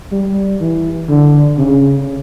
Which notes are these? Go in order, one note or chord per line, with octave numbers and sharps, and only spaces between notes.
G3
E3
D3
C#3